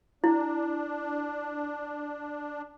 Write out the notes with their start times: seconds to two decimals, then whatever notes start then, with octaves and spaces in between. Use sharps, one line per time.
0.24 D4 E4